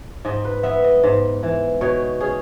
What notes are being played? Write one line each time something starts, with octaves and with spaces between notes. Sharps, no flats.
G#2 D#5
B4
B3 E5
D#5
G#2
E3
B2 C#5
C#4 G#4